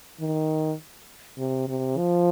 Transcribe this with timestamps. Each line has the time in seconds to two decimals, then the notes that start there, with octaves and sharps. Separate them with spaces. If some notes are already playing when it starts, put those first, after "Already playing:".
0.20 D#3
1.38 C3
1.68 C3
1.98 F3